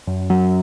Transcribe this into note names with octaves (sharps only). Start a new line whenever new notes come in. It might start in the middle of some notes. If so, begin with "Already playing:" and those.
F#2
F#3